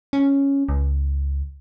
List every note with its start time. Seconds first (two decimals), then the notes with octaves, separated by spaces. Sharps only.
0.13 C#4
0.69 C#2